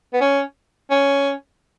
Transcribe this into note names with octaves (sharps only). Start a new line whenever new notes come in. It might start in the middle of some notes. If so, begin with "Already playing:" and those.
B3
C#4
C#4